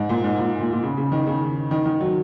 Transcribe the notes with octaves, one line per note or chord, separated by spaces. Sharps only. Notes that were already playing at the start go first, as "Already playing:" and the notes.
Already playing: G#2
A#2
G#2
A#2
A#2
A#2
C#3
C#3
D#3
C#3
D#3
D#3
F#3